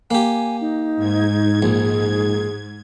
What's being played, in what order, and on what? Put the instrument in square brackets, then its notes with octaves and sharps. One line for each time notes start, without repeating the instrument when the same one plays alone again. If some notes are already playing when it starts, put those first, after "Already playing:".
[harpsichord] A#3 G4 [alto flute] G#5
[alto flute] D#4
[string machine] G#2 G#6
[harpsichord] A#1 [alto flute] G#4